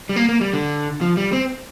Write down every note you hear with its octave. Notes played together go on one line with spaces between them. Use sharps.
G3
A#3
A#3
G3
D3
F3
G3
C4